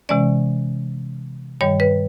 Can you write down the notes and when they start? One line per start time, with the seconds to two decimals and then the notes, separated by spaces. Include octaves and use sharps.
0.09 C3 E3 G#3 C#4 D5
1.61 G2 D#3 G3 C#5
1.80 B4